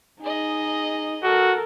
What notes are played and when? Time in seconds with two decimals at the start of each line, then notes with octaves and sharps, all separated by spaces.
0.22 D#4 G#4 D#5
1.24 F#4 A4 A#4